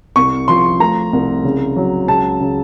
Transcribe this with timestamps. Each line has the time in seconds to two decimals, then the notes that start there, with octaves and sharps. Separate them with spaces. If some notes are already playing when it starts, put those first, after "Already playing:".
0.16 C2 C#6
0.48 F3 C6
0.80 A3 A#5
1.13 C2
1.44 C#3
1.77 F#3
2.08 C#2 A5
2.40 C#3